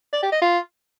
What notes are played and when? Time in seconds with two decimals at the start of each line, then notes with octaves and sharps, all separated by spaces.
0.13 D5
0.22 G4
0.32 D#5
0.42 F4